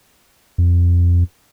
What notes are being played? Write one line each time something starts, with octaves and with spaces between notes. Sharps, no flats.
F2